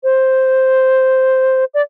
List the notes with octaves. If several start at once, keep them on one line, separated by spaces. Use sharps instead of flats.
C5
D5